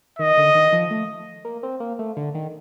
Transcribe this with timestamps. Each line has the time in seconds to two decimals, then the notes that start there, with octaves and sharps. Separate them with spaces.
0.19 D#3 D#5
0.37 D3
0.55 D#3
0.72 F3
0.91 A3
1.45 A#3
1.63 C4
1.80 A#3
1.99 A3
2.17 D3
2.35 D#3